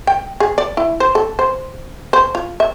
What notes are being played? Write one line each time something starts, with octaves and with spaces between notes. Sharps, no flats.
G5
G#4
D5
E4
C5
A4
C5
C5
F4
E5